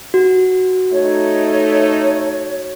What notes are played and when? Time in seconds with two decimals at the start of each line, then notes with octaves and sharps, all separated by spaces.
0.14 F#4
0.93 A3 D#4 C#5